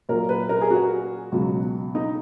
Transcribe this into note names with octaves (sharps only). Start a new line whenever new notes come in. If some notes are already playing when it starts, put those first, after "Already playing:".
A#2 F#3 A#4
B4
A#4
G#4
F#4
C#2 B2 F#3
D#4